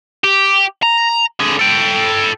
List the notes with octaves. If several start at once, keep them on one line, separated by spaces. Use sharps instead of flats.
G4
A#5
D3 G#4
A4 G5